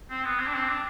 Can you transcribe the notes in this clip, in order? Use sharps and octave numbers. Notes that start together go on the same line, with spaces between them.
C4
B3
C4
D4
C4
D4